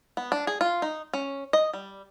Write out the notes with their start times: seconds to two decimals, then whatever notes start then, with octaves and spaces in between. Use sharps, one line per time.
0.17 B3
0.32 D4
0.47 G#4
0.61 F4
0.82 D#4
1.14 C#4
1.53 D#5
1.74 G3